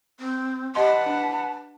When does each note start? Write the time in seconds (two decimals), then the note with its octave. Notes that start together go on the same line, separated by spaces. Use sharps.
0.19 C4
0.75 G4 B4 D#5 F#5 A5 C6
1.06 D4